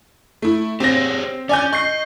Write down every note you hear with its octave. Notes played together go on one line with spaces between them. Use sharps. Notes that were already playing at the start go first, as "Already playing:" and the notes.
A3 E4
C4 G4 G#4 C#5 A#6
C#4 D5 G#5 G6
D#5 C#6 G6 C7